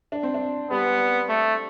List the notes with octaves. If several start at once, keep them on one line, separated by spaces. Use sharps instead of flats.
D4
C4
D4
G3 B3
A3